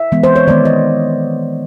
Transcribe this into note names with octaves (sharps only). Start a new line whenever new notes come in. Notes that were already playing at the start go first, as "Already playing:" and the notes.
Already playing: E5
E3 G#3 B3
C5
C#5
D#3 G#3 B3 D5
D#5